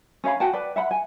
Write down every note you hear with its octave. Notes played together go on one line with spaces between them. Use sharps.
C#4 C#5 F5 B5
F#4 F#5 G5 A5
B4 D5
E5 F#5 B5
G#5